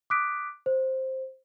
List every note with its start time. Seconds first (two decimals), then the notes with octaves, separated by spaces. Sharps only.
0.10 D6 D#6 F#6 B6 D7
0.66 C5